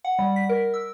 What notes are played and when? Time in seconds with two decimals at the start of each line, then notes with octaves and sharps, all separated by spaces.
0.04 F#5
0.19 G3
0.36 B6
0.49 A#4
0.74 E6